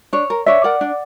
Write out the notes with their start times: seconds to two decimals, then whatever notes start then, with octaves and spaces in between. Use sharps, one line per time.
0.13 D4 C#5
0.30 A#4
0.46 D4 C#5 E5
0.64 A#4 D5 F#5
0.81 D4